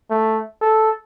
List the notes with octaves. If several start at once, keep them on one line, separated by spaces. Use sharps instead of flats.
A3
A4